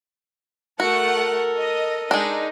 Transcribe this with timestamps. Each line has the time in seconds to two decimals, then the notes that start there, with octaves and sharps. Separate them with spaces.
0.80 A3 F#4 A4 A#4 F#5
1.57 D#5
2.11 G#3 D4 D#4